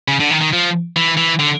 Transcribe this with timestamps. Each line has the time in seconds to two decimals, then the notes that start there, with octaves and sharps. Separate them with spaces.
0.08 C#3
0.20 D3
0.30 D#3
0.41 D#3
0.53 F3
0.96 E3
1.17 E3
1.39 D3